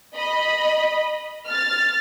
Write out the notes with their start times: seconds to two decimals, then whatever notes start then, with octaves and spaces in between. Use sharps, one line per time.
0.15 D#5 B5
1.48 F6 A6